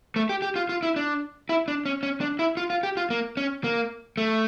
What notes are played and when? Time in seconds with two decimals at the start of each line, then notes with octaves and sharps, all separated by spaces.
0.16 A3
0.29 G4
0.42 G4
0.56 F4
0.69 F4
0.83 E4
0.96 D4
1.49 E4
1.68 D4
1.85 C#4
2.03 C#4
2.21 D4
2.39 E4
2.57 F4
2.70 F4
2.83 G4
2.97 F4
3.10 A#3
3.37 C#4
3.64 A#3
4.17 A3